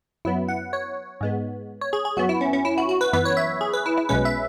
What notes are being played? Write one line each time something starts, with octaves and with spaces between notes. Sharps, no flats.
F#2 F#3 B3 E4
F#5
C#5
G#2 G#3 B3
C#5
G#4
G#4
F#2 F#3 B3 F#4
E4
C#4
C#4
E4
F#4
F#4
B4
F#2 E3 B3 B4
C#5
E5
G#4
B4
E4
E4
B1 B2 G#3 C#4 B4
E5